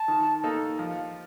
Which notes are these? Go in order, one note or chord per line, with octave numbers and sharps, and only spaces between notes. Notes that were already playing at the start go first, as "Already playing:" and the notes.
Already playing: A5
D#3
A#3 D#4 A4
F3